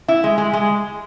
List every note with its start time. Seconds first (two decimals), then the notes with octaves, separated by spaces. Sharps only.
0.08 E4
0.24 G#3
0.38 G#3
0.53 G#3